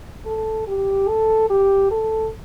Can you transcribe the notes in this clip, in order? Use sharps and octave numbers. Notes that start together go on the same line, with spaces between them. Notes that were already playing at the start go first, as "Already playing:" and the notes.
A4
G4
A4
G4
A4